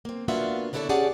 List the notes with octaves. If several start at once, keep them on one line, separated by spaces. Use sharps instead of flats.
A#3 C4
A#3 B3 D4 F4 F#4 E5
D3 D4 E4 G#4 A4 C#5
C#4 G4 G#4 D5 F#5 A5